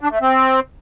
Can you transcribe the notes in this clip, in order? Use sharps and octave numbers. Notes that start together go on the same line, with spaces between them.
D4
A3
C4